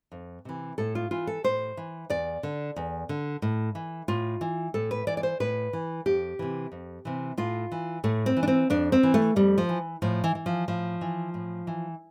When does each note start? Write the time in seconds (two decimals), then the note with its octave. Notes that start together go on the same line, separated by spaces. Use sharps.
0.12 F2
0.45 C3 E3
0.78 A2 A4
0.95 F4
1.11 E3 F4
1.27 A4
1.44 A2 C5
1.77 E3
2.10 E2 D5
2.43 D3
2.76 E2
3.09 D3
3.42 A2
3.75 E3
4.08 A2 F4
4.41 E3
4.74 A2 A4
4.91 B4
5.07 E3 D5
5.17 D5
5.23 C5
5.40 A2 B4
5.73 E3
6.06 F2 G4
6.39 C3 E3
6.72 F2
7.05 C3 E3
7.38 A2 F4
7.72 E3
8.04 A2 A3
8.26 C4
8.37 E3
8.43 D4
8.48 C4
8.70 F2 D4
8.92 C4
9.03 E3
9.14 A3
9.36 F2 G3
9.58 F3
9.69 E3
10.02 A2 F3
10.24 E3
10.35 E3
10.46 F3
10.68 A2 F3
11.01 E3
11.34 A2
11.67 E3